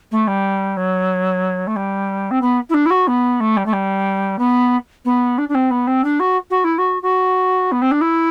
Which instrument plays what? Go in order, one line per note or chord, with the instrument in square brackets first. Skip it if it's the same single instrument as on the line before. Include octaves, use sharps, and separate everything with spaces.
[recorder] A3
G3
F#3
A3
G3
C4
B3
E4
D4
E4
F#4
B3
A3
G3
A3
G3
B3
B3
D4
D4
C4
B3
C4
D4
F#4
F#4
E4
F#4
F#4
B3
C4
D4
E4